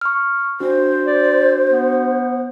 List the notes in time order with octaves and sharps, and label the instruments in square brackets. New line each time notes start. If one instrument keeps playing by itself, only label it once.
[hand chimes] C#6 F6
[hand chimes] D4 F#4 [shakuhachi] C5
[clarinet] D5
B3